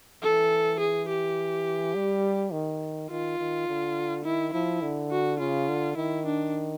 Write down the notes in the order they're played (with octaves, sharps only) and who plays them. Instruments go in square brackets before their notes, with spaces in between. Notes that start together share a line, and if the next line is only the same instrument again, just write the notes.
[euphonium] E3 [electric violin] A4
[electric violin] G#4
G4
[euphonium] G3
D#3
[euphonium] D#3 [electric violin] F4
[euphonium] D#3
D3
[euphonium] D#3 [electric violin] E4
[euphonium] F3 [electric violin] E4
[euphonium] D3
[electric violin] F#4
[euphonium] C#3 [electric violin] F4
[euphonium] D3
[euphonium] D#3 [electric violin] E4
[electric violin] D4